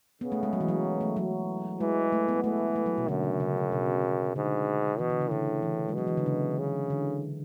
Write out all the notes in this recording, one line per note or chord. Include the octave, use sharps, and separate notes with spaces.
C#3 B3
A3
G#3
F#3
E3
F#3
A3
F#3
E3 G#3
A3
B3
E3 A3
A3
F#3
B2
F#2 D3
C#3
C#3
B2
G#2 D3
B2 E3
D3
C#3
A2 D3
E3
G#3
B2 F#3
E3
D3
C#3
C#3
D3